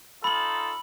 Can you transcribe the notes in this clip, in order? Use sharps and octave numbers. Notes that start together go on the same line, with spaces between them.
D#4 F4 A4 B5 F#7